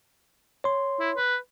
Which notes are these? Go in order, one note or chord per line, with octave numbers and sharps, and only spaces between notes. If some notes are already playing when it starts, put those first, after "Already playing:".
C#5 C6
E4
B4